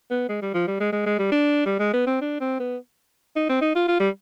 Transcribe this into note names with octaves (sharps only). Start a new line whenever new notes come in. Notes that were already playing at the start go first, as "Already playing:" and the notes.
B3
G#3
G3
F3
G3
G#3
G#3
G#3
G3
D4
G3
G#3
B3
C4
D4
C4
B3
D#4
C4
D#4
F4
F4
G3